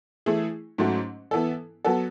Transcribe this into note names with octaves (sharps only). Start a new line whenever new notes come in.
E3 A3 E4 G#4
G#2 F#3 A3 C#4 F#4
E3 B3 E4 A4
F#3 B3 F#4 A4